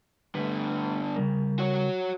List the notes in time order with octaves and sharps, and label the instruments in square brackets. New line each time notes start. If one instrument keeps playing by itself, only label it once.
[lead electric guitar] G2 D3 [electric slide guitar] A3 B4
[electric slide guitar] C#3 G3 A#4
[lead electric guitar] F#4 C#5